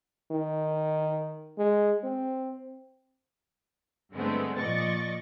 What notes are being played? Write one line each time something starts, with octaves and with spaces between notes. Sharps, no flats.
D#3
G#3
C4
G2 D3 G#3 A3 B3 C4
A#2 F3 D5 D#5 C#6 A6